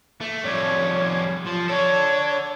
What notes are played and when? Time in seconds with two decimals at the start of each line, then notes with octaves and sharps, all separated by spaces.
0.21 A3
0.44 F2 G3 C#5
1.47 F3
1.69 D4 A4 C#5